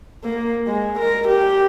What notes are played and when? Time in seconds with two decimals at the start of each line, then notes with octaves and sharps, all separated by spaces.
0.24 A#3
0.67 G#3
0.99 A#4
1.27 G4